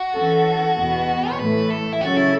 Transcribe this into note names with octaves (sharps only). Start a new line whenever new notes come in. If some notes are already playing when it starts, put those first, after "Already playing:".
Already playing: F#4
E3 C#4 A4
E2 B2 B3
C#5
A2 E3 A3 B4
A4
E4
C#3 F#3 C#4 F#4 A4
E4